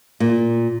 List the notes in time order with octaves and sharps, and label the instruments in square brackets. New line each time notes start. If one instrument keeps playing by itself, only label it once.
[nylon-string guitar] A#2